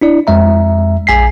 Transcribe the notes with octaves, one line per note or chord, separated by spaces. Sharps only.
D4 E4 D5
F2 G#3 E5 A#5
A#1 G#5 B6 C7